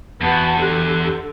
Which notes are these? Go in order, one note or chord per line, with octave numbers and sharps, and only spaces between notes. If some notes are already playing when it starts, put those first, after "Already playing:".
E2 B3 F#4 A5
D3 G4 F#6